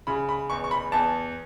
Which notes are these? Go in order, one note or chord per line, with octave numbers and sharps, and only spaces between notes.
C#3 B5
B5
E2 C#6
C#6
B5
E2 A5